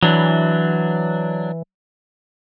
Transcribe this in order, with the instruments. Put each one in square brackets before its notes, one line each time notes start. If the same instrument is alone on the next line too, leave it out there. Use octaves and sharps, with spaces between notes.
[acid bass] E3 [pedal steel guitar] F#3 D4